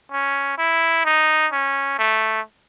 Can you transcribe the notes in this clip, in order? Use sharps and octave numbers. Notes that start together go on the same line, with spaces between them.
C#4
E4
D#4
C#4
A3